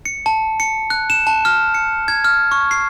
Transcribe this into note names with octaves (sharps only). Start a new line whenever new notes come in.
C#7
A5
C#7
F#6
E7
A5
F6
C#7
G#6
F6
C#6
C7